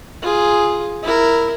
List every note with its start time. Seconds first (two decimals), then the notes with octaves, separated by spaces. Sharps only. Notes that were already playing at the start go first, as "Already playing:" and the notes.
0.22 F4 G#4
1.03 E4 A#4